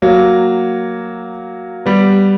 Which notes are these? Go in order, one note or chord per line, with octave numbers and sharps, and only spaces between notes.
F#3 A#3
G3 B3